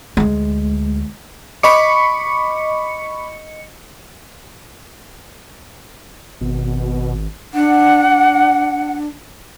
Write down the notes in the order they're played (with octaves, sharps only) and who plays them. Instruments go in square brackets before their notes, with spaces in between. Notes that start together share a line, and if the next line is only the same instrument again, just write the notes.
[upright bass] D2 G#3
[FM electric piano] D#5 C#7 [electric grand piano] B5 C#6 D6
[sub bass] G#1 [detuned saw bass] B2
[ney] D4 [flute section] F#5